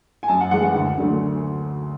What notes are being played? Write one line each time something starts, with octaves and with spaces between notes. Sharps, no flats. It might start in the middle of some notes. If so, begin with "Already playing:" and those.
G#5
F#2 A5
F#5
E3 G#3 F#5
F#5
D2
D3 F#3 A3